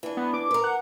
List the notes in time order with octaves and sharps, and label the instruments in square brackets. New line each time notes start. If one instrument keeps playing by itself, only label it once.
[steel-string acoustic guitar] E3 D4
[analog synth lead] B3
D6
[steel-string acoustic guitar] A#4 B4
[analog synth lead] F#5